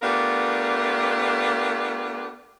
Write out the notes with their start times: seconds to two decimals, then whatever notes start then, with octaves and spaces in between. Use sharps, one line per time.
0.02 A3 B3 D4 F4 G4 A#4